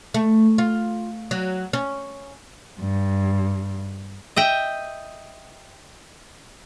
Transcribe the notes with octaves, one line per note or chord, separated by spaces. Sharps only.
A3
F4
F#3
C#4
G2
D#5 E5 G5